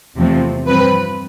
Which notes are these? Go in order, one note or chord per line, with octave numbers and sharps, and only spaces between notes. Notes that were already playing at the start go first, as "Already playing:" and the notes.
E2 C3 F3 A3 C4
G2 F3 C4 B4